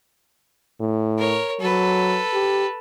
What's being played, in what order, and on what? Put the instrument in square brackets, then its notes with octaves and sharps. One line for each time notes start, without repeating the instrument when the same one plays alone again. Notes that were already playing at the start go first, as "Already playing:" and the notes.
[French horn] A2
[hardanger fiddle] A#4 C#5
[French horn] F#3 [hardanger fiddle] A4 B4
[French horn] G4